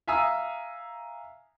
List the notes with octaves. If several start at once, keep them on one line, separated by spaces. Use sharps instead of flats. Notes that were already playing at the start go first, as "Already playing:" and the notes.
E5 F5 G#5 A#5 D#6 E6